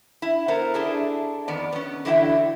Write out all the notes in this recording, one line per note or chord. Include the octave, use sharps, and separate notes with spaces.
E4
B3 A4 A#4 C5
D4 E4 G#4 A4
F2 D#3 B3 D5
B3 C#4
D3 E3 F#3 E4 F5 G5